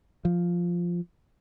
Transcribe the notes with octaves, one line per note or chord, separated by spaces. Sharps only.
F3